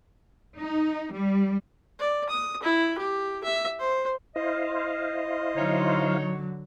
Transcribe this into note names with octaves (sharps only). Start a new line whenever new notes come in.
D#4
G3
D5
D#6
E4
G4
E5
C5
E4 C5 D#5 F5
D3 F#3 D#4 C#5